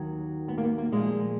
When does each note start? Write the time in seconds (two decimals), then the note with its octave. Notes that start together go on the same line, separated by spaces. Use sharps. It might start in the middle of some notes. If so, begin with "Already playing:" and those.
Already playing: D#2 D#3 F#3
0.48 B3
0.58 A#3
0.63 B3
0.78 A#3
0.92 A#2 F3 G#3